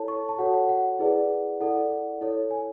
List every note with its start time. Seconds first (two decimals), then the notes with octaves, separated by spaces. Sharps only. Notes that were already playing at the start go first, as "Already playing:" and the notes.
Already playing: E4 A4 C#5 A5
0.08 C#6
0.29 A5
0.39 F#4 A4 C#5 F#5
0.54 F#5
0.69 F#5
0.99 E4 G#4 B4 D5
1.60 E4 A4 D5 F#5
2.21 E4 A4 C#5
2.51 G#5